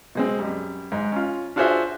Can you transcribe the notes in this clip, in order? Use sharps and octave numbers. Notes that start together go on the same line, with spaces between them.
B2 G#3 C4
F#2 G3
G#2 G#3
C#4 F4
D4 F4 F#4 G#4 C5 E5